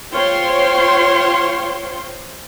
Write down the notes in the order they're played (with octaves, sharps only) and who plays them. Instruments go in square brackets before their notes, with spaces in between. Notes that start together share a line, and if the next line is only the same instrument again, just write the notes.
[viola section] F4 C5 C#5 G5 C6